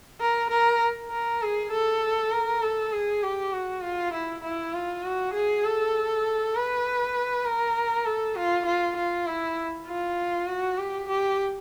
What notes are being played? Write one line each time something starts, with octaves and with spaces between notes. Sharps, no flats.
A#4
A#4
A#4
G#4
A4
A#4
A4
G#4
G4
F#4
F4
E4
E4
F4
F#4
G#4
A4
B4
A#4
A4
F4
F4
F4
E4
F4
F#4
G4
G4